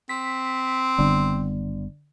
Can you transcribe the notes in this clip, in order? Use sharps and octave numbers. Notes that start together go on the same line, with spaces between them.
C4 B6
F#1 D3 G3 B3